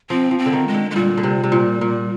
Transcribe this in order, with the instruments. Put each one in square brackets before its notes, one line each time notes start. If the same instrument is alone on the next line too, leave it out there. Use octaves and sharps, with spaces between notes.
[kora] F3 [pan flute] C4
[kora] F3
[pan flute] C4
[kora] D3
D#3
[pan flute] G#3
[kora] D3
[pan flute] G#3
[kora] A#2 [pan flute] G3
[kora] D3
C3
C3
A#2
A#2